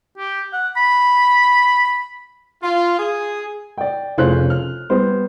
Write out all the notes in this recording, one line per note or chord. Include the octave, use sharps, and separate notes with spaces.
G4
F#5
B5
F4
G#4
D5 G5
F1 C#3 C#4 F4 C5 F#6
F6
G3 B3 C5